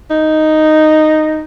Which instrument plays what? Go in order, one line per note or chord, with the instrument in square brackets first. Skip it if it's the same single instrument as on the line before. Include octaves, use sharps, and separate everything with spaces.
[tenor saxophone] D#4